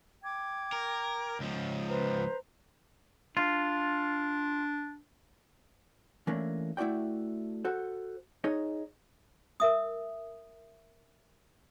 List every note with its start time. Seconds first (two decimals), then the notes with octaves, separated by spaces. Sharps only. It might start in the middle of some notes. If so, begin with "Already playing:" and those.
0.23 G5 D6 G#6
0.72 A#4
1.40 C#2 F3
1.89 B4 C5 A#5
3.37 D4 F4
6.27 E3 A3 A#3 C#4 D4
6.77 A3 E4 F#4 D5 G5
7.65 F#4 A4 C5
8.44 D#4 G#4 C#5 D#5
9.60 A#4 E5 D#6